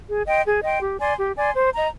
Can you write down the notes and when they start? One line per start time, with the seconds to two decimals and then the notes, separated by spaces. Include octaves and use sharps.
0.08 G#4
0.26 D#5 G5 C6
0.45 G#4
0.63 D#5 G5 C6
0.81 G4
0.99 D5 G#5 C6
1.18 G4
1.36 D5 G#5 C6
1.55 C5
1.73 D#5 A#5